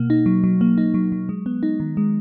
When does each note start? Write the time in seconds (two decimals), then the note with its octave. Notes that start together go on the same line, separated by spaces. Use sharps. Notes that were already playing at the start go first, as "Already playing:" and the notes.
Already playing: B2 A#3
0.10 D#4
0.26 F#3
0.44 F#3
0.61 A#3
0.78 D#4
0.94 F#3
1.12 F#3
1.29 G#3
1.46 B3
1.63 D#4
1.80 D#3
1.97 G#3